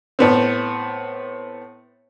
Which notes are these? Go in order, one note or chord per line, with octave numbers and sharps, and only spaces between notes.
A2 B3 C4